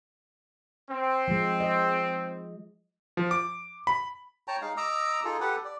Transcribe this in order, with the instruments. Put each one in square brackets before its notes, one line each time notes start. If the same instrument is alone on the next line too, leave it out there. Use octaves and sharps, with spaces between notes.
[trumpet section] C4
[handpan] F3 G#3
D#5
[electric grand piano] F3
D6
B5
[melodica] C#5 G5 A5 A#5
G#3 D#4 F5
D#5 A#5 D6 E6
D#4 F4 G#4 A4
G4 A4 B4 F#5
D5